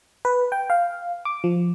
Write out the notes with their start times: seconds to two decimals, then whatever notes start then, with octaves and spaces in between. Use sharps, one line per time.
0.25 B4
0.52 G5
0.70 F5
1.25 D6
1.44 F3